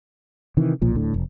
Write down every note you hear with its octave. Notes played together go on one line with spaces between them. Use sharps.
C3 D#3 E3
D1 B1 A#2 F3
D1 A2 D3
F1